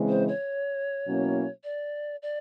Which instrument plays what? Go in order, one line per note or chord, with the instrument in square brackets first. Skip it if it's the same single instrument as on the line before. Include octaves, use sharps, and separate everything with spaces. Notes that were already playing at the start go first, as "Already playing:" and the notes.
Already playing: [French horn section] C#3 E3 G#3 C4
[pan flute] C5
C#5
[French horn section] B2 F#3 A#3 C#4 E4
[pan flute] D5
D5